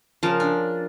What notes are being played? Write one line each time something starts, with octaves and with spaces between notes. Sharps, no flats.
C#3 F3 A#4 A5
D4